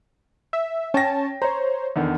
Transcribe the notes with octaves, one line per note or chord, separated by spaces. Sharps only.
E5
C#4 C#5 G5 A5 A#6
C5 C#5 A#5
E2 D3 D#3